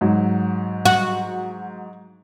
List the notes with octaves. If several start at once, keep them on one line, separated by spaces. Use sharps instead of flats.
G#2 F#3
F#4